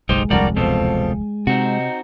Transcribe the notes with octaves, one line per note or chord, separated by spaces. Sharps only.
F#1 B1 G#3 D#4 G4 C5
D1 C2 F2 G3 D4 F#4 A#4 D5
E2 B2 F3 C4 A4
C3 C4 D#4 F#4